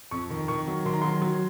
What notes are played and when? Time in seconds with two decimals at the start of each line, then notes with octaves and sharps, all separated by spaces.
0.11 F2 C#6
0.30 D#3
0.48 D#3 C#6
0.67 F#3
0.85 D#3 C6
0.93 A#5
1.02 F#3 C6
1.22 F#3